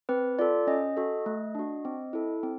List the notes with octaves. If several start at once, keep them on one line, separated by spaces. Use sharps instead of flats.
C4 B4
F4 A4 D5
C#4 D#5
F#4 A4
A3
D4 F#4
C4
E4 A4
C4